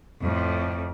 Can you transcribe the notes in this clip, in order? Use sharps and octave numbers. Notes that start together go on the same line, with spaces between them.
F2 A2